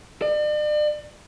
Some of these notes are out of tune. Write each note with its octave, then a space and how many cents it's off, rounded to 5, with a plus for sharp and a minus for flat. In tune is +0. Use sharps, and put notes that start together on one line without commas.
D5 +40